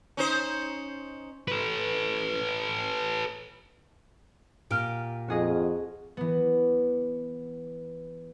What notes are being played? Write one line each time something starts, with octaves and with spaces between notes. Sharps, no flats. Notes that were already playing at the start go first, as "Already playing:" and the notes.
C#4 D#4 C5
A4 B4
A#2 G4 F6 D7
F2 F#4 G#4 D#5
E3 B3